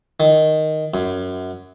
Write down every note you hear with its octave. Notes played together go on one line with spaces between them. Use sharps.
D#3
F#2